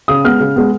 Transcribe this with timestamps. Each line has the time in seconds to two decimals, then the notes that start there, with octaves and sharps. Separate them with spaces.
0.08 C#3 D#6
0.24 G#3 B3 F6
0.40 C#3
0.56 G#3 B3